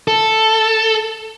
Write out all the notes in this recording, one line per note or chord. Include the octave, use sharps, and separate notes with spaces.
A4